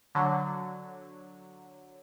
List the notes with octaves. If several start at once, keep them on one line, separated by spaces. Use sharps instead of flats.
D3 F#3